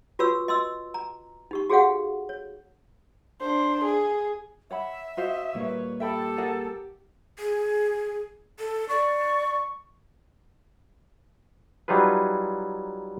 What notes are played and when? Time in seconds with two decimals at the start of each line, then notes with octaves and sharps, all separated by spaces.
0.19 F4 F#4 B4 C#5 C#6 E6
0.48 D#5 C6 E6
0.94 A#5
1.51 D#4 G4 C#6
1.70 F#4 G#4 A4 C#5 F5 F#5
2.29 C#5
3.41 D4 C5
3.84 G#4
4.71 C#5 E5 F#5 B5
5.17 F#4 C5 D#5 F5
5.55 A#2 G3 A#3 B4 C#5
6.00 G4 A4 E5 G5 B5
6.37 G#4 A#4 F#5
7.39 G#4
8.59 A4
8.89 D5 C#6
11.88 F#3 G3 D#4 F4 G#4 B4